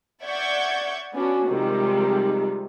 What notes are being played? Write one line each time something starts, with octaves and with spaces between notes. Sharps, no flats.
D5 E5 F#5 C#6 G6 G#6
B3 C#4 D4 F#4
C3 D#3 F3 G3 G#3